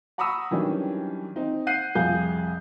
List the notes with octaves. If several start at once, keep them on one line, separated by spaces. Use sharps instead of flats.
F#5 A#5 B5 C#6 D#6 E6
D#3 E3 F#3 G3 C#4 D4
C4 D#4
F#5 F#6 G6 C7 D#7
C2 F2 G#4 F5 G6